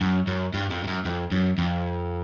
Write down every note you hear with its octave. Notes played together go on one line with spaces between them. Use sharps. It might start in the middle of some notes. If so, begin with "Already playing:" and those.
F#2
F#2
G2
F2
G2
F#2
F2
F#2
F2